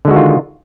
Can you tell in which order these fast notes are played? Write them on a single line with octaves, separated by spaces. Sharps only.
D3 G#3 F#4 D#3 F4